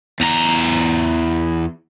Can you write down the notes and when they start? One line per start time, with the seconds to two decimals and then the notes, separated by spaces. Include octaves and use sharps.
0.20 E2 A#5